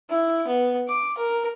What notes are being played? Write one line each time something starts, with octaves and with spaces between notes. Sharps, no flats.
E4
B3
D6
A#4